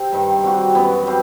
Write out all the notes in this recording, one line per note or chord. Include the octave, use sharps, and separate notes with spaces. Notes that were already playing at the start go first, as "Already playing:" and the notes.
Already playing: C3 C4
G2 D#3 G3
G3 C4 F#4
F#2 E3 B3
G3 C4